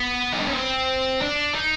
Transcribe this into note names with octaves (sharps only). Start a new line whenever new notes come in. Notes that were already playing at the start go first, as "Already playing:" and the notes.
Already playing: B3
D#4
D4
C#4
C4
D4
D#4